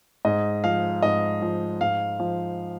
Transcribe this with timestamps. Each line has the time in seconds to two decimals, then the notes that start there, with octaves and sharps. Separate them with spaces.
0.25 G#2 D#5
0.64 F3 F5
1.03 G#2 D#5
1.42 F3
1.81 G#2 F5
2.20 F3